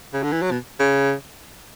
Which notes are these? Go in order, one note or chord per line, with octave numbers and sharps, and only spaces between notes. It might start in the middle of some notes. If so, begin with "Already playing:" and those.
C#3
D3
E3
F#3
B2
C#3